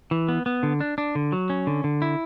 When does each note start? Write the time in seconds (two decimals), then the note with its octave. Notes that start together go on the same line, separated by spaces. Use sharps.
0.11 E3
0.29 B3
0.46 B3
0.63 D3
0.80 D4
0.98 D4
1.15 D3
1.32 F#3
1.50 C#4
1.67 D3
1.84 D3
2.02 E4